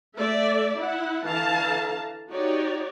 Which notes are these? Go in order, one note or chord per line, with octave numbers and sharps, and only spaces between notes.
A3 D5 E5
E4 F#5
D3 E3 F5 A5 A#5
D#4 F#4 G4 C#5 D5